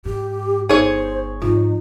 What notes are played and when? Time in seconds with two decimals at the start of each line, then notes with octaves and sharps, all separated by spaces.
0.05 G#2 G4
0.69 G1 D#4 G#4 C5 C#5
1.42 G#2 F3 D#4 F4